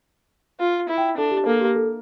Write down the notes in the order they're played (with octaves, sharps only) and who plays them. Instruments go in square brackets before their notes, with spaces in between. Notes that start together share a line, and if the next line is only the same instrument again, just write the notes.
[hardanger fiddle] F4
E4
[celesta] G5
[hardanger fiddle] D4 [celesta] A4
[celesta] G4
[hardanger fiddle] A#3 [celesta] A4
[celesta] G4
A4